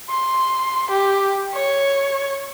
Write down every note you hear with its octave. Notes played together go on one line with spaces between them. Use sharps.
C6
G4
C#5